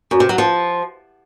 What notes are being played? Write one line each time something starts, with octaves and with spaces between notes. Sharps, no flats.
F#2
C3
F#3
F3